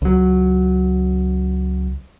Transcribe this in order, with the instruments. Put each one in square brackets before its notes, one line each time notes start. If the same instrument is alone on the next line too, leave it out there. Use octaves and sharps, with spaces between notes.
[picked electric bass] C#2 F#3